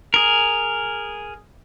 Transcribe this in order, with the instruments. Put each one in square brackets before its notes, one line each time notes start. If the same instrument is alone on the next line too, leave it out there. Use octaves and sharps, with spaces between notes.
[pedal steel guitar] G#4 A#4